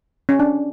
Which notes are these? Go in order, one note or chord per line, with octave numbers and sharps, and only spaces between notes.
C#4
D4